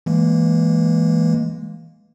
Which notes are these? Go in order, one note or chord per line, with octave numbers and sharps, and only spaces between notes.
E3 G#3 A#3